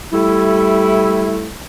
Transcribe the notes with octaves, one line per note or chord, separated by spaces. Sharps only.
G3 A3 E4